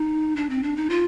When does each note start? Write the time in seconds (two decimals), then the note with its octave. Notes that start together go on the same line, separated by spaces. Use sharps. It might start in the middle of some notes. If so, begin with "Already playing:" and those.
Already playing: D#4
0.36 D4
0.50 C4
0.63 D4
0.76 D#4
0.90 F4